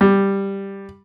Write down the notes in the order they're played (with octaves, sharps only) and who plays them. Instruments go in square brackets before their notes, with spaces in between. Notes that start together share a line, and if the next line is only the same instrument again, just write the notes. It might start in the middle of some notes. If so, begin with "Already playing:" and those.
[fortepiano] G3